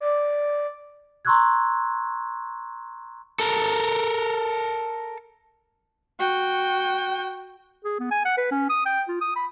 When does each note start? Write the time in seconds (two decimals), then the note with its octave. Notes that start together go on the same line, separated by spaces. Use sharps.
0.01 D5
1.25 A#5 C6 C#6 E6 F#6 G#6
3.40 A4 A#4
6.19 F#4 G5
7.84 G#4
8.00 B3
8.11 G#5
8.25 F#5
8.37 B4
8.51 C#4
8.69 D#6
8.86 G5
9.08 F4
9.21 D#6
9.36 B5